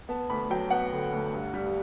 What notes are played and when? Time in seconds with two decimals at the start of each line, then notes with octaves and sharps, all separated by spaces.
0.09 B3 A5
0.30 D2 B5
0.50 F#3 G5
0.70 B3 F#5
0.92 D3
1.12 D2
1.33 G2
1.54 G3